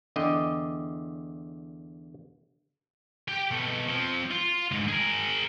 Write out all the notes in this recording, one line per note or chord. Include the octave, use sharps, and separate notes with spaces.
E2 D3 D#5 G5
G4 G5
B2 A3
F3 C4
F4
D2 G#2
G#4 A#4